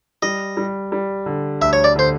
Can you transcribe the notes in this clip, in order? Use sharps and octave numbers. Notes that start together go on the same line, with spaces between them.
G3 D#5
G3
G3
D3
D2 E5
C#5
D5
D3 C5